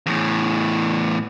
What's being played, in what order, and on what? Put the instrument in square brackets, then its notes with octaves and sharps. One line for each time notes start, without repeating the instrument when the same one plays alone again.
[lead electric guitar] E2 A2